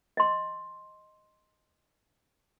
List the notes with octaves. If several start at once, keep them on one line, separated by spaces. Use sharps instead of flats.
D#5 C6